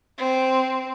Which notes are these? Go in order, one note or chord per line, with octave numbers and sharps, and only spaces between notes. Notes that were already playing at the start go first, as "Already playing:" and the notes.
C4